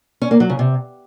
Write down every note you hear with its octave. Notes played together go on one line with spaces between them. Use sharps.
C#4
A#3
F#3
C#3
C3